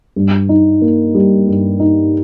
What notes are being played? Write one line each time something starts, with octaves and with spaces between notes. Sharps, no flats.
G2
D#4
A#3
G3
G2
D#4